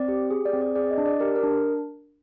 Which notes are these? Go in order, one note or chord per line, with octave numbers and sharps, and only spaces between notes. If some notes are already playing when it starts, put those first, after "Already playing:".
Already playing: C4 D5
G4
G#4
D5
C4
D5
G#4 D5
D#5
D4
D5
G4 A#4
A#4
D4